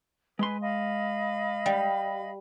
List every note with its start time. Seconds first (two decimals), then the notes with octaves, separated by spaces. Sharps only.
0.39 G#3 B4 G#5 C6
0.61 D#5 F5 B5
1.66 G3